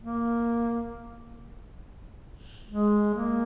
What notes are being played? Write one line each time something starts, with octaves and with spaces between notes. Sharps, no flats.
A#3
G#3
A#3